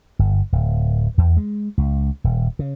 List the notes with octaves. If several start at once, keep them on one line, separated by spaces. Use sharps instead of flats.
G1
D1
E2
G#3
C#2
D#1
C#3